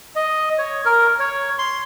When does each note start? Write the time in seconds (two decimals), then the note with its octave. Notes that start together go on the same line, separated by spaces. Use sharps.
0.16 D#5
0.58 C#5
0.85 A#4
1.19 C#5
1.59 C6